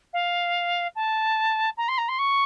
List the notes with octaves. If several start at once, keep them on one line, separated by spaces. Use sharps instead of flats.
F5
A5
A#5
C6
A#5
C6
C#6